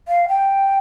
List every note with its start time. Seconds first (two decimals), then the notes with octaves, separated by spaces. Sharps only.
0.08 F5
0.28 G5